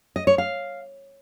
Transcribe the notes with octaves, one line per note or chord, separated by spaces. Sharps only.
D#5
C#5
F5